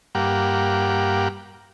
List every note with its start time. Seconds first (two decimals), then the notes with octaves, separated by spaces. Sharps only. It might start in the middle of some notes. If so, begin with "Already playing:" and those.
0.15 G2 A#3 G4 F5 F#5 D6